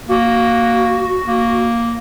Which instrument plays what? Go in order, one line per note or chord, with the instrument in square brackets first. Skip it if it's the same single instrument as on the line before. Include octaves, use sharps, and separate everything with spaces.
[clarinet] A#3 [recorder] F#4
[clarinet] A#3